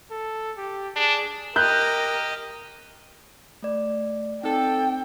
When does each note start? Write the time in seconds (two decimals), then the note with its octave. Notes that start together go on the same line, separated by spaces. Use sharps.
0.11 A4
0.58 G4
0.96 D4 G#4
1.56 G4 A#4 D#5 F#6 G6
3.63 A3 D5
4.43 C4 D#4 A4 G5